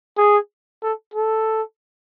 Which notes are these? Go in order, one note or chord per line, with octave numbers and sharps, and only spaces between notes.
G#4
A4
A4